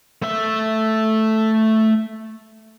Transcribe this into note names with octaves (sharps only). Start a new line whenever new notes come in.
A3 E5